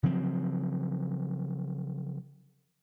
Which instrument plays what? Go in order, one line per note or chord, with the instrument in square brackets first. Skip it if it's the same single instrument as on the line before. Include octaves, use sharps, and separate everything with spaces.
[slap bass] C#3 F3 F#3 C4